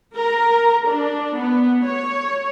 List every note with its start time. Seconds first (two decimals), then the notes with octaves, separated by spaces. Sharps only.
0.17 A#4
0.87 D4
1.38 B3
1.86 C#5